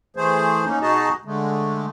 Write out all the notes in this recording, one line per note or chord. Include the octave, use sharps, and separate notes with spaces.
E3 A3 G#4 C5
A#3 C#4 D#4
B2 D#4 F#4 G#4 D#5 A5
D3 G#3 A3